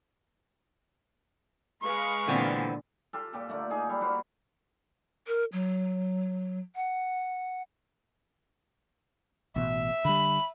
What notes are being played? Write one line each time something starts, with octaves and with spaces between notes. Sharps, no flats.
G#3 B4 F5 C#6
A#2 D3 E3 B3 C4
F4 G4 A4
A#2 G4 A4
D3 A3 A#3
D#4 G#4
G3 A4
G3 A#3 F#4 C5
A#4
F#3
F#5
A1 B2 E5
D3 G3 B5